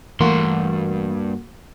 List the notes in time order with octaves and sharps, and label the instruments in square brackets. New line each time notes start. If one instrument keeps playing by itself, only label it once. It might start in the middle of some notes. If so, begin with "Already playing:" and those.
[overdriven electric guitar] G2 C6 [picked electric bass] E3 A3 [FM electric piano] A#3 F#4